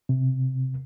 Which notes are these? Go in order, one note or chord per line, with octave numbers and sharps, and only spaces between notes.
C3